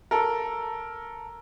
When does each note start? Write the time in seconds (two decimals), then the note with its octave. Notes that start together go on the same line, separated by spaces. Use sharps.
0.11 A4 A#4